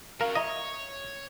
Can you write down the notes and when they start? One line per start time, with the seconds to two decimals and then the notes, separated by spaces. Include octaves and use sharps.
0.21 F#3 C#4 A#4 F5
0.35 C#5 D#5 E5 A#5